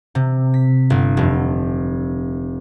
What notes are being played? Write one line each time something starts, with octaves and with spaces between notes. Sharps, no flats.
C3
B6
G1
F1